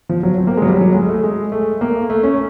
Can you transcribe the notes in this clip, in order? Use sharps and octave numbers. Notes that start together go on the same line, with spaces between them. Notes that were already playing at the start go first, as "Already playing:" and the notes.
F3
F#3
C4
A#3
G#3
F#3
G3
F#3
G#3
A3
G#3
A3
A#3
A3
C#4